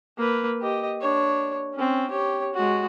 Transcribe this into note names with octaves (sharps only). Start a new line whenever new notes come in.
A#3 B4
G4 D#5
D4 C#5
C4 C#4
G4 C#5
G#3 F#4